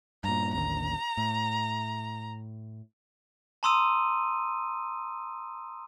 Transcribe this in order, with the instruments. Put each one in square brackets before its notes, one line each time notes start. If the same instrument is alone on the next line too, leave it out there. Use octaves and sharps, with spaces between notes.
[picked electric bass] G2 A#2 [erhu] A#5
[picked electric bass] A1 D#2 D3 [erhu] A#5
[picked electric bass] A2
[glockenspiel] A5 A#5 C6 D#6 E6 D#7